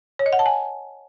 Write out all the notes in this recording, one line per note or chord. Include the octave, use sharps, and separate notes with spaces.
C#5
D#5
F#5
A5
G#5